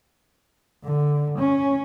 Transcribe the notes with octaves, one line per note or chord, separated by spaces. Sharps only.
D3
C#4